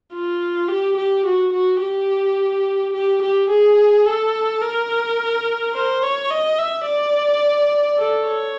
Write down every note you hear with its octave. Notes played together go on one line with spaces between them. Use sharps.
F4
G4
G4
F#4
F#4
G4
G4
G4
G#4
A4
A#4
C5
C#5
D#5
E5
D5
A4
C#5